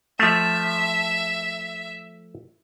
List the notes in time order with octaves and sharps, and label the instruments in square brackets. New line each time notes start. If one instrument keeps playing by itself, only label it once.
[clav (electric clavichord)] F3 A3 [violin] E5